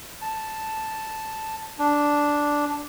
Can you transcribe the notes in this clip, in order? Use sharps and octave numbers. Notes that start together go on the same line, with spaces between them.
A5
D4